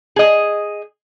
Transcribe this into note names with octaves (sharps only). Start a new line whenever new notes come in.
G#4 D#5